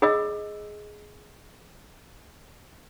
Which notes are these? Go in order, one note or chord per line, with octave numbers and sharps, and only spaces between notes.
G#4 D#5 E6